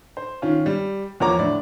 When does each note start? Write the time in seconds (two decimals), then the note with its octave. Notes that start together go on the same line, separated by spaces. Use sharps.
0.17 C5
0.42 D#3 C#4 F4
0.66 G3
1.20 E2 F3 A#3 C#5 A#5 D6
1.39 A2 D3 D5